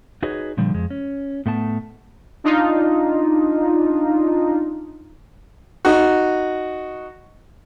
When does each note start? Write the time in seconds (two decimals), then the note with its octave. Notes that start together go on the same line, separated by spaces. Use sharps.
0.23 D#4 F#4 G#4 B4 C#5 D#5
0.57 A#2 D3 F3 G3
0.74 F2 G#3
0.90 C#4
1.46 A2 A3 B3 A5
2.44 D4 D#4 F4
5.85 D#4 F#4